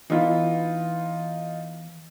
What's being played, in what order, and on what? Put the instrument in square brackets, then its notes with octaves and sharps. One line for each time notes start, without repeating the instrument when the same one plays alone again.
[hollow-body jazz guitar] E3 B3 [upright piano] D#4 F4